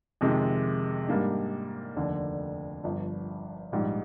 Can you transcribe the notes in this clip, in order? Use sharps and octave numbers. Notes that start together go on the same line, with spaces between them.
F2 C3 D#3 G#3
G#2 G3 A#3 D4
F1 D#2 D3
G1 G2 F3
A#1 G#2 G3